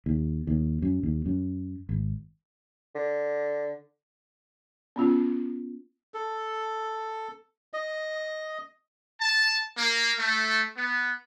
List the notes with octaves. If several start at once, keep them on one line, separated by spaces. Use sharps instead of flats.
D#2
D#2
F#2
D#2
F#2
G#1
D3
B3 C#4 F4
A4
D#5
A5
A#3
A3
B3